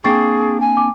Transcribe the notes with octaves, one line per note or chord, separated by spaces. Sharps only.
A#3 C4 D4 G#4 C#6 A6 C7
G#5
D6